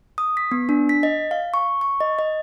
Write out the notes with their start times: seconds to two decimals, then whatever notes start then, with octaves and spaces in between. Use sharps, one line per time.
0.18 D#6
0.37 B6
0.52 B3
0.69 D4
0.89 B6
1.03 D#5
1.31 F5
1.54 C#6
1.81 C#6
2.00 D#5
2.19 D#5